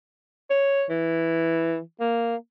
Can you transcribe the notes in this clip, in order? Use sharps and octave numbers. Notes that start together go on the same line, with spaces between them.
C#5
E3
A#3